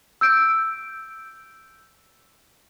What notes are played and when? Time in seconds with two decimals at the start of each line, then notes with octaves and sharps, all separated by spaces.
0.21 E6 G6 D7